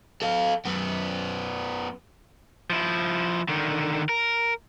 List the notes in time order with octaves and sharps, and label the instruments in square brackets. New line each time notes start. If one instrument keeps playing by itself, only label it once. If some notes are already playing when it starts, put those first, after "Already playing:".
[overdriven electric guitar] A4 F5
F#2 B3
F3 E4
D3 D#3
A#4